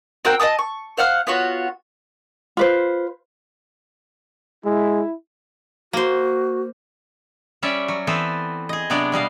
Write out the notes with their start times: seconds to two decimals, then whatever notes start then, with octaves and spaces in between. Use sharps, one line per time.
0.25 C4 F#4 A#4 G5
0.40 D#5 G5 A5 D#6
0.59 C#6
0.97 C5 F5 F#5 F6
1.27 B3 F4 F#4 C#5
2.57 F4 B4 C5
4.65 G#3 E4
5.93 A#3 F#4 C5
7.63 G3 C#4 C#5 D5 E5
7.88 F#3
8.07 E3 B3 C4 A4 B4 C5
8.69 G#4 D#5
8.90 C3 F#3 B3 D4 D5
9.12 B2 G3 D#5 F5